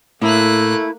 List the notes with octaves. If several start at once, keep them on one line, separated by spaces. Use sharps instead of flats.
A2 A3 A#3 E4 F#6